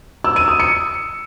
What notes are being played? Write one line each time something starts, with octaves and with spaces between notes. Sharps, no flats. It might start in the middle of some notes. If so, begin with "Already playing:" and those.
E6
D#7
D#6
C#7